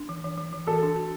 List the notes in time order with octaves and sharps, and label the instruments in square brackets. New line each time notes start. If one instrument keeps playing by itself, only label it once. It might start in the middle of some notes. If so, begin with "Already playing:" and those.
Already playing: [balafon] D4
E3
E3
E3
E3
[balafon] F#4 [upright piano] A4
[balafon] D4
F#4